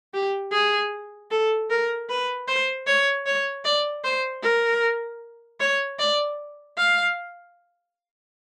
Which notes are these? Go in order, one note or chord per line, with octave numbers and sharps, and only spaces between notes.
G4
G#4
A4
A#4
B4
C5
C#5
C#5
D5
C5
A#4
C#5
D5
F5